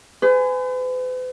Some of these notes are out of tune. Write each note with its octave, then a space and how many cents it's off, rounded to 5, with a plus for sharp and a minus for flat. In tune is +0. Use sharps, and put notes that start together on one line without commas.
G#4 +0 B4 +45